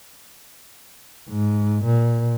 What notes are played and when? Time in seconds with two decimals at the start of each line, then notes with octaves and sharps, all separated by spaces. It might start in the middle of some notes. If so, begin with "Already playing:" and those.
1.29 G#2
1.84 A#2